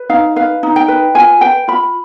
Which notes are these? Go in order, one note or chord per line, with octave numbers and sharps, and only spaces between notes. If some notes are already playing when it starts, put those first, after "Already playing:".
Already playing: B4
D#4 F5
B4 F5
D#4
G5
B4
F4 G#5
B4 G5
F4 B5